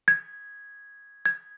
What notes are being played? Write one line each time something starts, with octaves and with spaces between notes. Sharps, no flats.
G#6
G#6